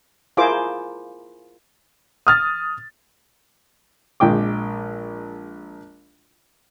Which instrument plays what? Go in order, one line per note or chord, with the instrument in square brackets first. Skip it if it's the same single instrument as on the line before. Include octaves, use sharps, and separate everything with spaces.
[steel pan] E4 F4 G#4 A#4 C5 D6
[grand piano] D#6 F6 A6
[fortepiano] A#1 G#3 G5 D6